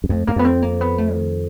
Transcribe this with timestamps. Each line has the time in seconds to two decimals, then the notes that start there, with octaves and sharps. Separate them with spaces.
0.04 F#2
0.09 F2 A3
0.27 F#2 A#3
0.36 F2 B3
0.45 C4
0.62 A#3
0.81 B3
0.98 A3
1.15 D#3